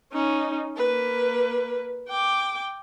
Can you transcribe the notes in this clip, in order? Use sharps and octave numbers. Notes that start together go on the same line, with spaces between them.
C#4 D#4
A#3 B4
G5 D6